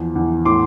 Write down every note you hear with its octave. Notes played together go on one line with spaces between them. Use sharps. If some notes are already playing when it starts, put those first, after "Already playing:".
Already playing: E2 F3
E2
A2 C6 D6